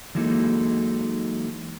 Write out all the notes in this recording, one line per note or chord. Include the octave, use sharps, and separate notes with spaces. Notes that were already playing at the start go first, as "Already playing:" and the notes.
E3 F#3 G#3 A#3 D#4 A4